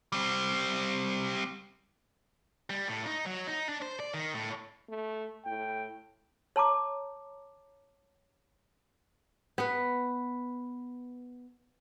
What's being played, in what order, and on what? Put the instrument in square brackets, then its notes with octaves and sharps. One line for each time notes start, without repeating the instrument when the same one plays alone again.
[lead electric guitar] G3 C4
[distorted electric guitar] G3
A2
D#4
F#3
D#4
D4
C5
D5
D#3
A2
[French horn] A3
[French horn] A2 [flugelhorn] G5
[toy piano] C#5 A5 A#5 D6
[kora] B3 B4